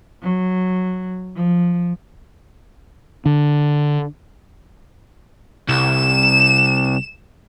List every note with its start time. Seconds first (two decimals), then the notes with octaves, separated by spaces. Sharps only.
0.22 F#3
1.35 F3
3.26 D3
5.69 C2 E7